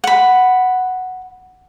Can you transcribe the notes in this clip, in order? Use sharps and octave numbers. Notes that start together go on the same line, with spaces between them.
F#5 B5